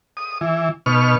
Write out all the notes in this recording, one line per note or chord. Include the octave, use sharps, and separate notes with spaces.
D#6
E3
B2 D#4 C#6 F6